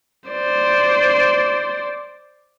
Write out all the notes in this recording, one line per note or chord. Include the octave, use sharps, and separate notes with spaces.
C5 D5